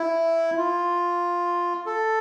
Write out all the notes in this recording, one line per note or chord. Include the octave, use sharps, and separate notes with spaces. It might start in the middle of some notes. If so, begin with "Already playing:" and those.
Already playing: E4
F4
A4